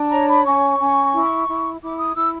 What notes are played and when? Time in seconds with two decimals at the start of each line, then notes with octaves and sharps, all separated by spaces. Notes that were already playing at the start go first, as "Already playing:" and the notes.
Already playing: D4
0.10 C#5 A#5
0.28 B5
0.45 C#4 C#6
0.79 C#4
1.13 E4
1.48 E4
1.82 E4 D6
1.99 D#6
2.16 E4 E6